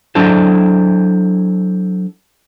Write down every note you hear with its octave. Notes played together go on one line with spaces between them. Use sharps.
F#3 D4 E4 A4 C5